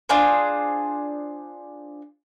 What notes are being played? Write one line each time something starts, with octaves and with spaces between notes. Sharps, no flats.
D4 F4 G#4 C5